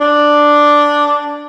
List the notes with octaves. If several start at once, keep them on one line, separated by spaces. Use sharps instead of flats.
D4